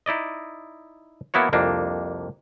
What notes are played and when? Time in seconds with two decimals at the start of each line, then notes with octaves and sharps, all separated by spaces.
0.06 D#4 E4 D5 D#5
1.34 E3 A#3 B3 E4 F#4 C#5
1.53 C2 F2 A#3 D4